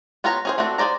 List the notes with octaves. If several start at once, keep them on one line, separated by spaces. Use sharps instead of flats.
B3 F4 C#5 F#5 A#5
C#4 G#4 C5
A3 C4 D4 F#4
G#4 A4 C5 D5 A#5